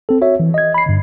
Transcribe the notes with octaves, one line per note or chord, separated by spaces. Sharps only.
C4 A4
F#4 C#5 E5
E3
D#5 G#6
B5 C7
G2 D3